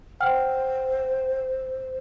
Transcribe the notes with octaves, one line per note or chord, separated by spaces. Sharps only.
C5 F#5 G5 F6